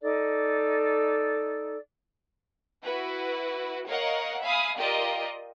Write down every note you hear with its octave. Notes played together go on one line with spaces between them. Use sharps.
D#4 A4 D5
E4 F#4 B4
A#4 C#5 D#5 F5 F#5
E5 F5 G#5 B5 D#6
F4 G4 A#4 D5 D#5